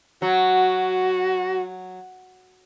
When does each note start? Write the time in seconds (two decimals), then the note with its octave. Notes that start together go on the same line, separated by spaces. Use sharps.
0.22 F#3 F#4